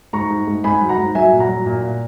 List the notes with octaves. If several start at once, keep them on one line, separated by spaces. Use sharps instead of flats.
G#2 A#5 C#6
G#2
G#2
G#2 G#5 B5
F#3
F#5 A#5
G#2
F#3 E5 G#5
A#2
F#5 A#5
F#3
A#2
A#2